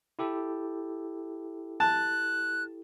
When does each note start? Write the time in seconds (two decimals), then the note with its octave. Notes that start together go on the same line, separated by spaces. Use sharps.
0.19 E4 G4 A4
1.80 A5 F#6